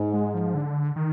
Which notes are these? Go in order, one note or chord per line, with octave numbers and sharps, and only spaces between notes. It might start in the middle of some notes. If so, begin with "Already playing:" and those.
Already playing: G#2
G#3
F3
D3
D#3